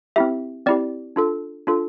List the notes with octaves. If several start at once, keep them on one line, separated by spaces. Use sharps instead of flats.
C4 E4 G4 E5
C4 E4 G4 D5
D4 F4 A4
D4 F4 A4